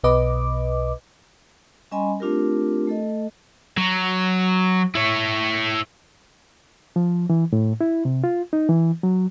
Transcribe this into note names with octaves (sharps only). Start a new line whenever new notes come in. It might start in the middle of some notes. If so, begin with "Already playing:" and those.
B1 B2 B4 D#5 D6
G3 C#4 D#5 G#5 B5 C6
A3 C4 D4 F4 G4 A#4
A3 A4 D#5
F#3
E4 C#5
F3
E3
A2
E4
C3
F4
D#4
E3
F#3